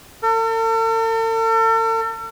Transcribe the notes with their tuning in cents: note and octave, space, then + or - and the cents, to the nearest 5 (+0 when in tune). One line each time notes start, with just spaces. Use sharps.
A4 +45